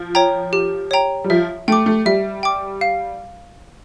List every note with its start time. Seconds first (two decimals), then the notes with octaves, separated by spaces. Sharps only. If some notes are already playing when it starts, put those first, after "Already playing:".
Already playing: F3
0.15 C#5 G5 A#5
0.53 G4
0.91 C#5 G5 A#5
1.24 G3
1.30 F3 E5
1.68 A3 G5 D6
1.86 A3
2.05 G3 E5
2.43 G5 D6
2.81 F5